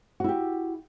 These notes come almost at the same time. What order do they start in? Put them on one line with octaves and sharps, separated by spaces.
F#4 E4 G4